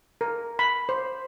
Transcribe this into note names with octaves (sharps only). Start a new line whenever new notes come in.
A#4
B5
C5